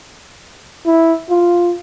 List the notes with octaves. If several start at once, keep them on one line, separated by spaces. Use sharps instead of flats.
E4
F4